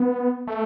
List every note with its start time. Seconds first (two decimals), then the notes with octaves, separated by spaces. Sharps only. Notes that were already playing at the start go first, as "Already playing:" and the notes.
Already playing: B3
0.47 A3